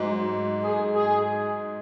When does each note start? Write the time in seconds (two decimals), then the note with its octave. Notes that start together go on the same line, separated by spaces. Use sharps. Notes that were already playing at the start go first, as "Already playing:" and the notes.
Already playing: G#2 F#3
0.64 G#4
0.95 G#4